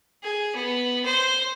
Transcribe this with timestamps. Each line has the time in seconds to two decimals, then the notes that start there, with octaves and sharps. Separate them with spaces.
0.23 G#4
0.56 B3
1.05 C5